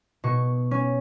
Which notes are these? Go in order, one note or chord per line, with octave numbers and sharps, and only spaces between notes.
B2 C#6
C#4